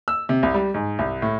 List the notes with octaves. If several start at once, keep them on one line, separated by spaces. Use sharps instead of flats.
E6
C3
C2
G3
G#2
C2
A2